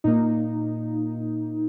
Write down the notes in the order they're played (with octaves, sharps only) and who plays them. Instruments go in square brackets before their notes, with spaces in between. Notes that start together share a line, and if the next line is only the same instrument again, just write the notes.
[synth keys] A#2 A#3 D#4